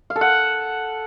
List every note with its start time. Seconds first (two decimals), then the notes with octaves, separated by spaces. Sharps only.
0.10 F5
0.16 A4
0.21 F#5